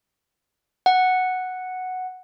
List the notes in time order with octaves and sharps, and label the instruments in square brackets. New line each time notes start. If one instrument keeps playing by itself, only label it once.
[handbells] F#5